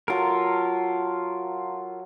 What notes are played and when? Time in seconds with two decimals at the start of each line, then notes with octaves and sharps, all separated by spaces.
0.08 F#3 F4 A4 A#4